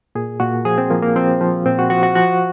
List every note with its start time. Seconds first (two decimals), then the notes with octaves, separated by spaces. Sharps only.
0.15 A#2 G#4
0.40 A#2 F#4
0.65 F3 G#4
0.78 C4
0.90 F3 A#3
1.03 A#3
1.16 F3 C4
1.41 F3
1.65 A#2 C4
1.79 F#4
1.90 F3 F#4
2.03 F#4
2.15 F3 F#4